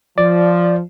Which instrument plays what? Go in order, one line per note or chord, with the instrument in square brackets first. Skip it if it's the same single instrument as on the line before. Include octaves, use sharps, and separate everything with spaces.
[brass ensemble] F3 [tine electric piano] D5